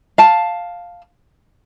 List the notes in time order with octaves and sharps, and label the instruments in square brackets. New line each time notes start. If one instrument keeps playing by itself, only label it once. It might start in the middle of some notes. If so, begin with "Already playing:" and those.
[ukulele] F5 A5